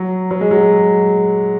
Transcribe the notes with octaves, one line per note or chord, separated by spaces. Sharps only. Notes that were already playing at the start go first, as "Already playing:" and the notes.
Already playing: F#3
F#3
G#3
F#3